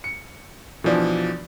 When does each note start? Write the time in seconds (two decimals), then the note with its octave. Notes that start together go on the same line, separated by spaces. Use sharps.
0.04 C#7
0.84 B2 E3 F3 D4